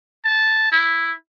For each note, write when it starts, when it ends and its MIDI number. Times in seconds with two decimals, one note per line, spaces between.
0.25 0.68 81
0.72 1.12 64